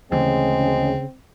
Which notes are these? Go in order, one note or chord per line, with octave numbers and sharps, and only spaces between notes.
D2 C#3 E3 G#3 A3 C4